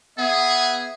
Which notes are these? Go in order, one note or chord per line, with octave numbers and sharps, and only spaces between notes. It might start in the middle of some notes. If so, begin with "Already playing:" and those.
B3 G#4 E5